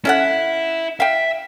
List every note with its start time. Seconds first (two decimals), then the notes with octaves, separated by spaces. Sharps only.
0.05 C#4 E4 A4 E5 F#5
1.00 E5 F5 G5